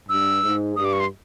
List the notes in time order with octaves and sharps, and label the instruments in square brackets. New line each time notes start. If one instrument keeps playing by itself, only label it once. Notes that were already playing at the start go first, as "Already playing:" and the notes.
[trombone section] G2 [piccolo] E6
[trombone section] G#2
[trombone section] G2 [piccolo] D#6
[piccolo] D6
C#6
C6